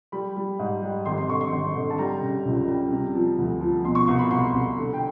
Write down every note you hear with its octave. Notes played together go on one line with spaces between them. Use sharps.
G3 B5
G3
G#2
G3
G#1 C6
C6
D3 C#6
C6
G#1
D3
A5
G3 A#5
C#3
C#2
G3
C3
F3
D2
F3
B2 C6
C#6
C2 C6
B5
C2 C6
C2
D3
G5